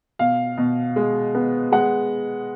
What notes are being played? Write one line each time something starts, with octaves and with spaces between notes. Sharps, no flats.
B2 F5
B2
G#3
B3
G#3 F#5